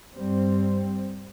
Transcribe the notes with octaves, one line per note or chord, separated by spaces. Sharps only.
G2 G3 C4